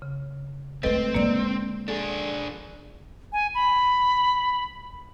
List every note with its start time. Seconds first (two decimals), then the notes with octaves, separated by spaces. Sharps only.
0.02 C#3
0.83 G#3 A3 C4 A4 B4 D#5
1.14 D3 G#3 A#3 D5
1.88 D4 G#4 A4
3.32 G#5
3.54 B5